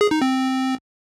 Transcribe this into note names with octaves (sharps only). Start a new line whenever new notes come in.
G#4
D#4
C4